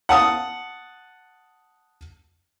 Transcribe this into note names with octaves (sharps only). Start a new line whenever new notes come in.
F#5 A5 D#6